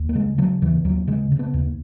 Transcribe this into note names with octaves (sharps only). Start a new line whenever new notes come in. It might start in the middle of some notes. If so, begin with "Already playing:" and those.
Already playing: D#2
A#3
C#3 G#3
C#3 F#3
D#2 E3
D#2 F#3
C#3 G#3
C#3
B3
D#2